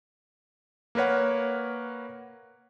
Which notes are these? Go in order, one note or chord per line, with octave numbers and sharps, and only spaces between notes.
A#3 A#4 B4 C#5 F#5